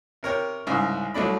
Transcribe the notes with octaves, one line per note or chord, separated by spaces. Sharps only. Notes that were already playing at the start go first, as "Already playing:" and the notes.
C3 A#4 C#5 G5
C2 G#2 C#3
C2 F#3 A3 D4 B5